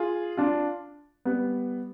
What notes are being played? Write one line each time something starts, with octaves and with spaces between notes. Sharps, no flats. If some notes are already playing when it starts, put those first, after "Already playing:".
Already playing: F4 G#4
D4 F4
G3 B3